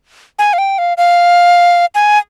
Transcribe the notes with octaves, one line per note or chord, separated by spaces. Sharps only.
G#5
F5
G5
F5
F5
G#5